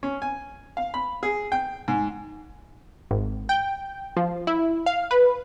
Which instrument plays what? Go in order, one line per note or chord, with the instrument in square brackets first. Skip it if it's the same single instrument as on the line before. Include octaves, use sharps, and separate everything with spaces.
[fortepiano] C#4
G#5
F5
B5
G#4
G5
G#2
[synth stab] G#1
G5
F3
E4
F5
B4